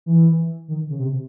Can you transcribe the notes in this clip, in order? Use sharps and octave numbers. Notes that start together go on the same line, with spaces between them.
E3
D#3
C#3
C3